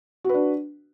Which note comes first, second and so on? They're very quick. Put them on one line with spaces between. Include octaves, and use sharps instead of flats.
F#4 B4 D4